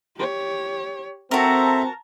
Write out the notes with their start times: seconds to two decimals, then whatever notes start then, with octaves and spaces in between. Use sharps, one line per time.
0.16 G4 C#5
1.31 C4 F#4 A4 A#4 E5 A5 A#5